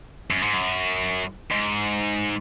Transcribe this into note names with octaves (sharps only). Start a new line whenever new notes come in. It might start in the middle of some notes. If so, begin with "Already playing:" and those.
F#2
G#2
F#2
G#2